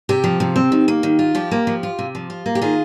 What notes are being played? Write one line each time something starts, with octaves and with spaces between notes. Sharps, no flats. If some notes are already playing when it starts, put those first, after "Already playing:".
C3 G4
F3
C3
C4
D#3
A#3
D#3
F4
F3 G4
A#3
F3
F4
C3
F3
F4
A#3
G4
D#3 F4 G#4